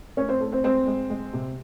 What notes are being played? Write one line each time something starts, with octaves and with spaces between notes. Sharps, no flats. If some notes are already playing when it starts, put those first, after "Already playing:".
A2 C#4 C#5
C4 C5
A2 A4
C4 C5
G#3 C4 C5
G#3
G#3
C3